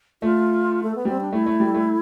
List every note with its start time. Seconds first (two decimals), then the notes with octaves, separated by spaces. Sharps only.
0.22 A3 F4
0.83 A3
0.96 B3
1.05 G3 C4
1.21 D4
1.32 A3 E4
1.46 A3
1.60 G3
1.74 A3